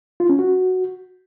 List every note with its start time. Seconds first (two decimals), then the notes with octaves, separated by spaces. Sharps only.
0.20 F4
0.29 C#4
0.39 F#4